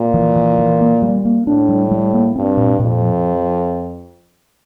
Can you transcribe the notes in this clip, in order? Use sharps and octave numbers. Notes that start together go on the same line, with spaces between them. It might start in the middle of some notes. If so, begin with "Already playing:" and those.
Already playing: A#2
E3
E3
E3
A#3
G3
A#3
A2 D4
G3
G3
A#3
G2 C4
A#2
F2 A#2
F3